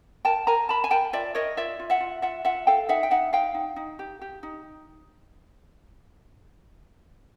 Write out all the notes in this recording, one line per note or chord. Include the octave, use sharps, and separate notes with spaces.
A#4 G5 A5
A#4 G#5 A#5
A#4 A5 B5
G#5
A#4 G5 A5
F4 D5 E5
A#4 C#5 D#5
F4 D5 E5
F4
E5 F#5
F4
F4 E5 F#5
F4 E5 F#5
A4 F5 G5
D#4 E5 F#5
G5
D#4 E5 F#5
D#4 F5 G5
D#4
D#4
G4
G4
D#4